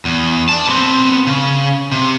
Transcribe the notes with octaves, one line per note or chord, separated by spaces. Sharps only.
E2
D5 A5
B3 C4
C#3
C3